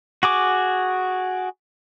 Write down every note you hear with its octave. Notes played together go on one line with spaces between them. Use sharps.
F#4 G#4 D6